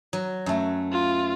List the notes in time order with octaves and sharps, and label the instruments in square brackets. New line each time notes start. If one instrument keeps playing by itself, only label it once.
[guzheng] F#3
F#2 A3
[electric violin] F4